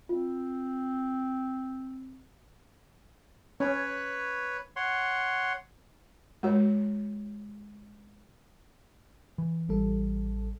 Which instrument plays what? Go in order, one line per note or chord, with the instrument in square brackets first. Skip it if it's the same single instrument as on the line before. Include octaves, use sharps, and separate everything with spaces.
[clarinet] C4 [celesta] F4
[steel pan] C#4 [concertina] B4 C#5
[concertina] C#5 F#5 C6
[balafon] G#3 F#4 C#5
[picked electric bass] E3
[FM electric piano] A1 G3 A4